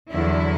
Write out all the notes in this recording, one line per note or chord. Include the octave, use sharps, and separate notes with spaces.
E2 D3 F#3 E4